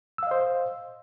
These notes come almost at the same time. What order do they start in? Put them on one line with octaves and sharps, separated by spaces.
E6 F5 D#5 C5